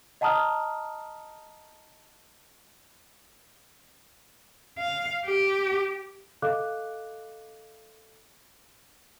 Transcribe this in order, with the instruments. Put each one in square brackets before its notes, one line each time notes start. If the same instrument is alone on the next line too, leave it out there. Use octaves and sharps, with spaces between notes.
[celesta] D#5 F#5 A5 A#5 D#6 F6
[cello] F5
G4
[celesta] A4 D#5 F5 D6 F#6